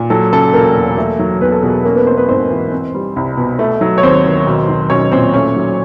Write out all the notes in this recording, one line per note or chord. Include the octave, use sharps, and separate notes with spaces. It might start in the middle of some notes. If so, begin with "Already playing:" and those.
Already playing: A#2
F#3 A4
C#3 A4
E1 A#3 A#4
E2
A3
F#3
E2 B3 B4
A4
B2 G#4
A4
A#3 C#4 A#4
B3 B4
A3 C4 C5
B3 B4
G#2 C4 C5
E3
C4
G3
C2
B2
A3
F#3
C#5
D#2 C4 C5
D#3
B1
F#3
B1 C#4 C#5
A#2 C4 C5
A3 C#4 C#5
F#3